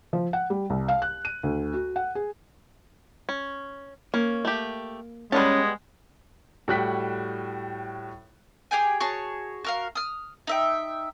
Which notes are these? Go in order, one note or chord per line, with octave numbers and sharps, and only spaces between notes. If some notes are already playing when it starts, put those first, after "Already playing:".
F3
F#5
G3
C2
F5
F#6
D#7
D2
F#4
F#5
G#4
C#4
A#3 C#4
A3 G4
G3 G#3 B3 C#4 B4 A5
A2 G3 F#4 G5 F#6 B6
G4 G#4 G5 G#5
F#4 G#4 C#5 A5
F#4 A#4 F5
D#6 F6
D#4 E5 G5